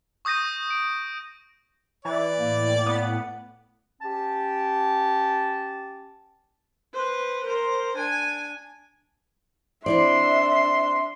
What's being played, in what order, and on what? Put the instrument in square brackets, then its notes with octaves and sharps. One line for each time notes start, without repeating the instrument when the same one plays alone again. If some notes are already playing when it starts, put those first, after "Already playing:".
[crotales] C#6 D#6 G6 A#6 D#7
D7
[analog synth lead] E3 [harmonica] D5
[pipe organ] A2 [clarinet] A#3
[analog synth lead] B3
[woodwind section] C#4 G4 A5
[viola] B4 C5
A#4 C5
D4 G#5
[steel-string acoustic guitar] C4 E4 D5 [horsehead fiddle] D4 E5 [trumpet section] C6